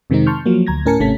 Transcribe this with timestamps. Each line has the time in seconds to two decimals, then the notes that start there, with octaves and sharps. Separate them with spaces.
0.10 F2 C3 D#3 G#3 C4 D#4
0.26 A5 C6 C#6 F6 G6
0.46 F3 F#3 A#3
0.67 D2 A#5 G#6 A#6
0.86 A2 C#4 A#4 G#5 A5 C#7
1.00 G#1 C3 A3 C#4 A5 B6